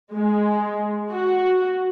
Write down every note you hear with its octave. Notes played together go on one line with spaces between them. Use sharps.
G#3
F#4